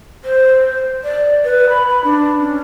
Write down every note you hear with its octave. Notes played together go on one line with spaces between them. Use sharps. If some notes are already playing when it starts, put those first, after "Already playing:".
C5
D5
B4
B5
B5
D4
C#4